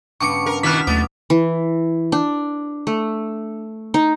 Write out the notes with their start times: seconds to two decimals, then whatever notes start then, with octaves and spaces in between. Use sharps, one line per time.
0.21 G2 C#3 B3 C#6 D6 C#7
0.46 A#4
0.63 B2 D#3 E4 F#4 D6 F6 F#6 B6
0.87 D#2 B2 F#3 A3 B3 D6
1.30 E3
2.12 D4
2.87 A3
3.94 D#4